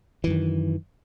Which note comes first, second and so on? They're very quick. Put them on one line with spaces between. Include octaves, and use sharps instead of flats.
E3 F#2 D#3